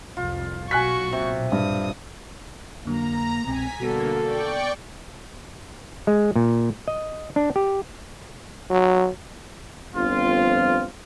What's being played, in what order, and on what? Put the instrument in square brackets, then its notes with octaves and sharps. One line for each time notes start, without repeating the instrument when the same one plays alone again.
[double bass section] C2 F2 [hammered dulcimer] F4
[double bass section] B1 A#2 [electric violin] F#4 C#6 [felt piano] G#5 F#6 B6
[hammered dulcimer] C3
[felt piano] G2 [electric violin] D#6
[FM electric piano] F2 D3 F#3 [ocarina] A#3 [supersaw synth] A#5
[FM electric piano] C2 B2 G#3 [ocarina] C4 [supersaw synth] G#5 B6
[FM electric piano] B2 G3 B3 [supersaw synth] D3 A#3 [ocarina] F#4 [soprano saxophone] A4
[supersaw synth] D5 G5 C#6
[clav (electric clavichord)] G#3
A#2
D#5
D4
G4
[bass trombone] F#3
[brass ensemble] G1 F2 C4 F4